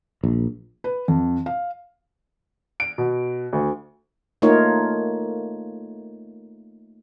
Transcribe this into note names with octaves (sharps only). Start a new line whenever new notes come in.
A#1
B4
F2
F5
D7
B2
D2
A3 A#3 D#4 F4 A#4 C#5